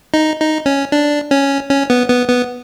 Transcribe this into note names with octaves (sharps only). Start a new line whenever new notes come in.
D#4
D#4
C#4
D4
C#4
C#4
B3
B3
B3